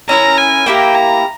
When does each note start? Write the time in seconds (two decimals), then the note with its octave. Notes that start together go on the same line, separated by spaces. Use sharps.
0.09 C#4 E4 A#4 A#5
0.37 G#5
0.66 A#3 E4 G4 A#4 G5
0.95 A#5